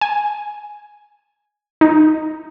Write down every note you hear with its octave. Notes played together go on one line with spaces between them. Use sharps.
G#5
D#4